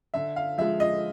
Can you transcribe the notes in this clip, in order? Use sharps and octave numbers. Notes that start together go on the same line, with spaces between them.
D3 E5
F5
F3 G#3 E5
D#5